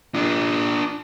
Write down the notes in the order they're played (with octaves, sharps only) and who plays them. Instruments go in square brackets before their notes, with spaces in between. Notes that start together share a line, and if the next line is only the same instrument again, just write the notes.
[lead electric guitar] D4 F4